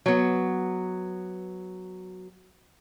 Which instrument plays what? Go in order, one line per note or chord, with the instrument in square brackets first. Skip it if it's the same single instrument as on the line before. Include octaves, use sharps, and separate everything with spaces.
[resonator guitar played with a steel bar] F#3 B3